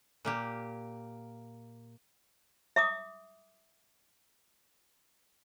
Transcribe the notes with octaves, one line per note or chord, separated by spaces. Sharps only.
A#2 A#3 G4
E5 D6 D#6